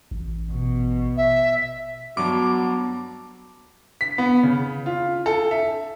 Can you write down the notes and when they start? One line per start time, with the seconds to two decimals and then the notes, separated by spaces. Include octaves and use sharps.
0.11 A1
0.52 B2
1.17 E5
2.17 G2 F#3 B3 F#4 A5 D6
4.01 B6
4.18 B3
4.43 C#3
4.86 F4
5.26 A4
5.51 E5